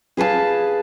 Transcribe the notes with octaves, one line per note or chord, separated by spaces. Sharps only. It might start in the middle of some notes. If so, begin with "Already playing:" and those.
G#4 B4 F5 A5